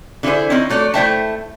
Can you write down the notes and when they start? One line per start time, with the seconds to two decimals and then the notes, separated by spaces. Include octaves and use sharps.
0.23 D3 E4 G4 G#4 C5
0.50 C4 C#4 D#4 E4
0.70 F#3 A3 C#5 D5
0.94 A3 E4 C5 E5 G5 A5